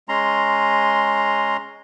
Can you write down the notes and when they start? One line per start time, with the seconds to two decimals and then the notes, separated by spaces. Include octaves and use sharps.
0.09 G#3 C#4 A#5 C6